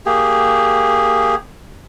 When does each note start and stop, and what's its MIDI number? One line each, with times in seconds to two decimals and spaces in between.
0.06 1.35 58
0.06 1.35 67
0.06 1.35 68